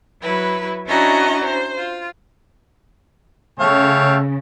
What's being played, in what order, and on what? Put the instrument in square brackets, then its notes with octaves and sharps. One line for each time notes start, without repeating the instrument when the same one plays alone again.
[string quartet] F#3 E4 B4
C#4 D4 E4 F#4 D#5 A#5
C5
F4
[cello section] C#3 [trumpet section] A3 F5 G5 [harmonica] A4 C#5